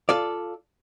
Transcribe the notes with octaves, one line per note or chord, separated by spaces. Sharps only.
F4 A4 D5